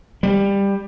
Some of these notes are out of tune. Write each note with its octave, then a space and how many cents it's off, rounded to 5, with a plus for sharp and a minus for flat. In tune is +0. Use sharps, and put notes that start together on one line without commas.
G3 +15